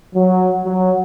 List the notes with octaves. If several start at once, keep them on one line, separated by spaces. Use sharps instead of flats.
F#3
F#3